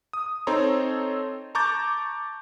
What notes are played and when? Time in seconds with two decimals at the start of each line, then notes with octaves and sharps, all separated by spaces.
0.13 D#6
0.47 C4 D#4 A4 C#5 A#5 C6
1.55 A5 A#5 C#6 D6 G6 A6